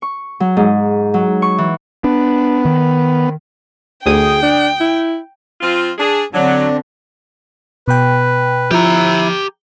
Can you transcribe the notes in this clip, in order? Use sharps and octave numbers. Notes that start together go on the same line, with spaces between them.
C#6
F#3
G#2
F#3
C#6
E3
B3 D4
D#3
D2 G#4 G5 D#6
D4
E4
F3 C4 F4
D4 G#4
D3 F#3 C4 D4
B2 B4 G5
F3 E4 G4 A#5